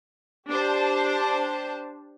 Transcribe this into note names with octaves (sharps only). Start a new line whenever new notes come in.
D4 G4 C5 A5